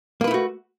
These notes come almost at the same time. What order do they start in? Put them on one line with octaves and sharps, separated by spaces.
A#3 B4 E4 A3 F#4